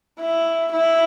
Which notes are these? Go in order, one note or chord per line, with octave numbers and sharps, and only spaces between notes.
E4
E4